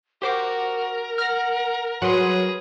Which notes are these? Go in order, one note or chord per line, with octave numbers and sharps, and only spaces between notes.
F#4 G4 A#4 C5 D6
F#5 F6 A#6
F#3 G#4 B4 F#5 C6